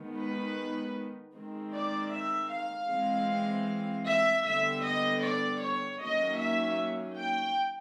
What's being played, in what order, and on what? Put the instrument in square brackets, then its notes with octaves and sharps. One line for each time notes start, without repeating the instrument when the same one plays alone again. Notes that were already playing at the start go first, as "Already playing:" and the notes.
Already playing: [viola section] D#3 G#3 B3
B4
D#3 G#3 C4
D5
E5
F5
E3 G#3 C4
E5
D3 G3 B3 E5
D#5
D5
C#5
D#3 F#3 A#3 C#4 D#5
E5
G5